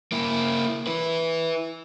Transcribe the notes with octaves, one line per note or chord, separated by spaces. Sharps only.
A#3 E4
E4 B4